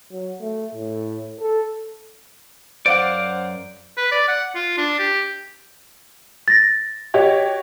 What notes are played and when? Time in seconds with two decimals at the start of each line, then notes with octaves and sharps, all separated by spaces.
0.12 F#3
0.40 A3
0.74 A2
1.40 A4
2.86 F#2 C5 D5 F5 F#5
3.97 B4
4.11 D5
4.28 F#5
4.55 F4
4.78 D4
4.99 G4
6.48 A6 A#6
7.14 F#4 G4 C#5 D#5